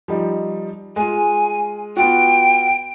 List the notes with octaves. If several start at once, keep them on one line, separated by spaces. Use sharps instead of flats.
F3 G3 D#4
G#3 F4 G#5
B3 F4 F#4 G5